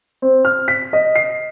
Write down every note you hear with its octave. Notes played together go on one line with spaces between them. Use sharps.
C4
F6
B6
D#5
C7